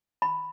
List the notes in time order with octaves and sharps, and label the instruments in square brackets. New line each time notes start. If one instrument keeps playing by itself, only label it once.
[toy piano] B5